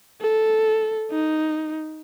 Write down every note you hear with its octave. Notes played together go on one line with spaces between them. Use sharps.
A4
D#4